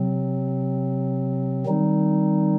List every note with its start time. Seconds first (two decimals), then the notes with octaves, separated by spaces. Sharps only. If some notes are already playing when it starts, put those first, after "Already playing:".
Already playing: C3 F#3 C4
1.66 D#3 G3 C4 D#4